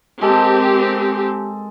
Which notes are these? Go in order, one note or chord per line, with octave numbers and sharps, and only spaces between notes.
G#3 C4 G4 A4 A#4